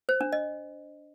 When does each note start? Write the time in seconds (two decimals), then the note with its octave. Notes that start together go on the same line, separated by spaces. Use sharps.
0.09 C5
0.21 D4
0.33 D#5